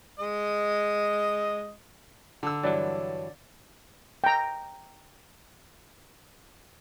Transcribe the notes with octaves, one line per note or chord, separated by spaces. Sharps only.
G#3 D#5
D3 E6
G2 E3 F#3 C#5 D5
G5 A#5